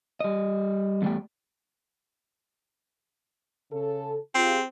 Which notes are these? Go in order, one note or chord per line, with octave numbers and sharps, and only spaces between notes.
G3 D#5
E2 E3 G3 A3 G5
C#3 A4
C4 F4 G4 G#4